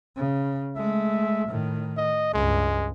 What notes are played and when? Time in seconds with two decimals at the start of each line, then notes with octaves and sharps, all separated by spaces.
0.16 C#3
0.76 G#3 A3 E5
1.48 A2 D#3
1.97 D#5
2.34 C#2 G2 G#3